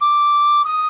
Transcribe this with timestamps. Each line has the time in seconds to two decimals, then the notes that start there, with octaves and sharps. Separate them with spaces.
0.01 D6
0.64 D#6